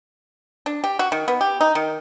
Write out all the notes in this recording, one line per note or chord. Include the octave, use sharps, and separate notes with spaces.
D4
G4
F#4
D#3
B3
G4
D#4
D#3